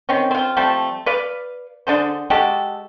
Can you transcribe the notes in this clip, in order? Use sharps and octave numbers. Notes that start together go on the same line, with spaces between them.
D#3 C4 C#4
C4 F4
F3 G3 A3 C4
B4 D5 F5
D3 D4 G#4 C5
G#3 F#4 G4 A4